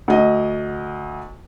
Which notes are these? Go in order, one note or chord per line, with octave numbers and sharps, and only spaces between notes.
D2 D#5